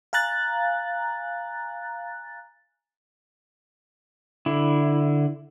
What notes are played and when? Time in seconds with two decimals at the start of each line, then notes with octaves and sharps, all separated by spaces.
0.13 F5 G#5 A#5 F#6 A6
4.46 D3 E4